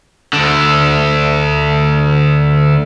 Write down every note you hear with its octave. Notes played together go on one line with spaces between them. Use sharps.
D2 D3